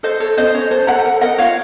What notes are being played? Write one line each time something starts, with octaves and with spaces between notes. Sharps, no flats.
A4 C5 D#5
A4 C#5
C#4 C5 D#5
C#4 C#5
A4 C5
A4 F#5 A#5
A#4
A#4 D#5 F#5
F4 C#5 F5